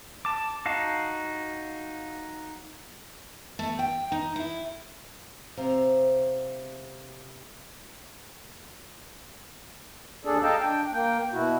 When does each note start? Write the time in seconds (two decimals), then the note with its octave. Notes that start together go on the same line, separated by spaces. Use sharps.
0.25 A5 D6
0.66 D#4 F#4 F5 A5
3.59 A3
3.79 G5
4.12 D#4
4.36 E4
5.57 C3 C5 F5 A#5
10.25 D#2 D4 G#4 A4 D5
10.43 A4 D#5 F5 G5 A5 A#5
10.61 D4 G5
10.93 A#3 G5
11.33 B2 E4 F#4